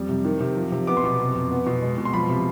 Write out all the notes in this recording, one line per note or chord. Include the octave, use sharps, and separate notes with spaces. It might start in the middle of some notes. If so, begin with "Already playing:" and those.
Already playing: F2 G3
C3
D#3
C3
F3
C3
B3 D6
C6
B2 D6
C3
F2
B3
B2
G#3
B2
C6
F3 B5
C3